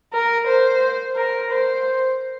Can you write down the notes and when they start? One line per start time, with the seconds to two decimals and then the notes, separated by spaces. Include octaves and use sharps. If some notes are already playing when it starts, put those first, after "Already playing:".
0.13 A#4
0.47 C5
1.16 A#4
1.51 C5